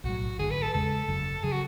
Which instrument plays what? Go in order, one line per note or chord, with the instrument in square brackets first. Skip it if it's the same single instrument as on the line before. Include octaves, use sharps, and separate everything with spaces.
[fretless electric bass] B1 A2 F#3 [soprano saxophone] F#4
[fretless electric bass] G#1 F#2 D3 [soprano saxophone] G#4
[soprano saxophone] B4
A4
[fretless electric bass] E2 C#3 G#3 [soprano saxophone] A4
[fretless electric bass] F#1 F#2 C#3
[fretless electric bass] C#3 F#3 [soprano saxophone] G#4
[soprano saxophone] F#4